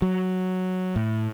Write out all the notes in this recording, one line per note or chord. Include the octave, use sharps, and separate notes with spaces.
F#3
A2